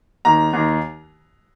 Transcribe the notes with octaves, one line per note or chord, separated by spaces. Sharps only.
D#2 D#3 A#5
D#2 D#3